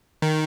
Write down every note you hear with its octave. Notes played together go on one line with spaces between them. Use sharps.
D#3